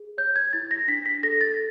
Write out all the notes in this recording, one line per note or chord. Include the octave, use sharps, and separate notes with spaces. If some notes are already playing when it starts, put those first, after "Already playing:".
Already playing: G#4
C#5 G6
G#6
E4 A6
A#6
D4 B6
B6
A4 A#6
A6